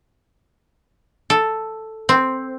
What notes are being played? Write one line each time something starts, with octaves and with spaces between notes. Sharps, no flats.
A4
C4